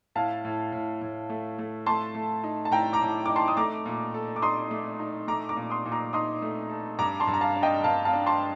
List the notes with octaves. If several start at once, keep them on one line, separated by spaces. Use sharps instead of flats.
A2 F5 A5
A2
A2
A2
A3
A3
A3 A5 C6
A3
D#4
A5
A2 G5 A#5
A#5 D6
A2
D#4 D6
A5 C6
D#6
A3 A#5 D6
A#2
A4
D6
D#4 C6 D#6
A3
D#4
A3 A#5 D6
A#5 D6
A#2
C6 D#6
A#2
A#5 D6
D#4 C6 D#6
A3
A4
G2 A#5 D6
A5 C6
G2
A#5
F5 A5
D4
D#5 G5
G2 F5 A5
F5 A5
D4
A5 C6